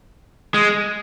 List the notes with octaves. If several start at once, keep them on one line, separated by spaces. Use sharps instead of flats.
G#3